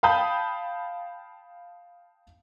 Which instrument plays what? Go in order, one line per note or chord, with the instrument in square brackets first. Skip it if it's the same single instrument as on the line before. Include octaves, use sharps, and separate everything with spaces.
[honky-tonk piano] F5 G5 A5 B5 D#6 G6